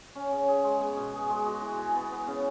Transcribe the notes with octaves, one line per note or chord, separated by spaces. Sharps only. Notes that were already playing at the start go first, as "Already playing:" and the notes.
C#4
C#3
G#4
G#3
B3
B2
G#4
G#3
F#4
E3
E3
B3
B3
C#3